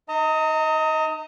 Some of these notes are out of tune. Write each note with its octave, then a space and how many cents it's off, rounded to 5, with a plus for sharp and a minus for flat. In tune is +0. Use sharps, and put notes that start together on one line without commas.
D#4 -20 D#5 +25 A#5 -30